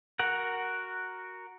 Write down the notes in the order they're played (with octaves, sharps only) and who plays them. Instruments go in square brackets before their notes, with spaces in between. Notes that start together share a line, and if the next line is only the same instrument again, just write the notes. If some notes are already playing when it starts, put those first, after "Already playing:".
[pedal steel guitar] F#4 A#4 F#5